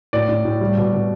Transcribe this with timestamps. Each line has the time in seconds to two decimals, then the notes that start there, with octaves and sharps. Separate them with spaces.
0.13 A2 D5
0.29 A2
0.45 A2
0.61 G3
0.77 B2
0.92 B2